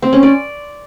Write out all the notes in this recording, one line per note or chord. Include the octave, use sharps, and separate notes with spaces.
C4
C#4
D5